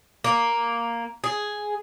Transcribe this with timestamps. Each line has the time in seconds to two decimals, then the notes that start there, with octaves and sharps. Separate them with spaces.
0.24 A#3
1.24 G#4